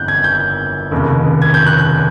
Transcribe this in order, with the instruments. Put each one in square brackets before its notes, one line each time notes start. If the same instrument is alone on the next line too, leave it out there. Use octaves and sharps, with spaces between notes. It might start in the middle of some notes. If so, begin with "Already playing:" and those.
Already playing: [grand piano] G1 F2 C#3 E3 F#6 G6
G#6
G6
F1 D#2 C#3
G#6
G6
F#6
F#6